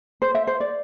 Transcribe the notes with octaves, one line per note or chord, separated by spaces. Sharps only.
C5
E5
C5
D5